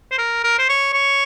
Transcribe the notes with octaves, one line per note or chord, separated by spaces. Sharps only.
C5
A#4
A#4
C5
C#5
C#5